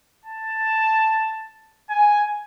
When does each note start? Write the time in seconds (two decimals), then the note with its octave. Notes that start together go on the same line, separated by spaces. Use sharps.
0.25 A5
1.89 G#5